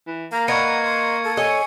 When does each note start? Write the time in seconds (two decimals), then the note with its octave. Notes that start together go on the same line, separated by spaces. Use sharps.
0.07 E3
0.32 A#3 A#5
0.48 A#4 B4 D#5 F#5 C#6 G#6 C#7
0.84 C6
1.24 A4
1.37 A4 C#5 D#5 G#5